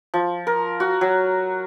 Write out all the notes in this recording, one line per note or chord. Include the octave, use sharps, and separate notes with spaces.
F3
A#4
F#4
F#3